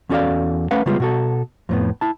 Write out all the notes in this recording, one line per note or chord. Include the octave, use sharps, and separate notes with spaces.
E2 C#4 F#4 A4 D5 F5
A3 C#4 B4 F5 F#5
C#3 G3 G#3 B3 F4
B2 F#4 A4
F2 A2 B3
E4 A5